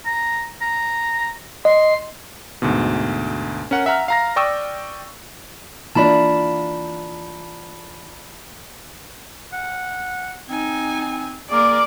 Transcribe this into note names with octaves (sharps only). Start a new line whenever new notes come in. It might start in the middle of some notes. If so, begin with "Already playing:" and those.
A#5
A#5
D#5 C6
D2 G#2 B2
C#4 A#4 F#5
E5 F#5 A#5 F6
F5 A#5 A#6
D5 G5 C#6 D#6 E6
E3 A#3 D4 E4 F4 A5 B5
F#5
C4 D#4 G#5
A#3 G#4 A#4 D5 D6